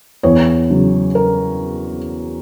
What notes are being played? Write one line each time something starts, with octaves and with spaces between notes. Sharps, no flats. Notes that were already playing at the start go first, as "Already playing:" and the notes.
E2 C#5
C#3 F#3
A#4